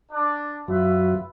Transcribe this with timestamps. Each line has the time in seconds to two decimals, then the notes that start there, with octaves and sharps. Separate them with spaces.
0.12 D4
0.68 F#2 F#3 F4 B4 E5